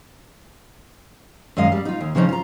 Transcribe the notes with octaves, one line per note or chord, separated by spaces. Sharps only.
F#2 D#3 G#3 D#5 F5
G3
D#4 F4
D#2
C#3 E3 F3 C#4 D#4
F4 A#5